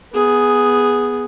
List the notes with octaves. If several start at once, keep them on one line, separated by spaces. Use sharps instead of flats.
B3 G#4